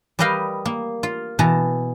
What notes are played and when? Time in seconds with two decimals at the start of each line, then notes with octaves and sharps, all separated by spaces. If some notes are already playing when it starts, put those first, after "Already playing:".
0.19 G3 A#4 B4 D#5 F5 G5
0.65 A#3
1.03 F4
1.39 B2 E3 A5 A#5